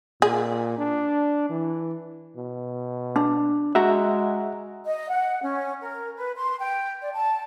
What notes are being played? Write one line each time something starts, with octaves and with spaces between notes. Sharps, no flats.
A#2 G#4
D4
E3
B2
D4
G#3 F#4 E5 F#5 A#5
D#5
F#5
C#4
A#4
B4
C6
G5
D5
A5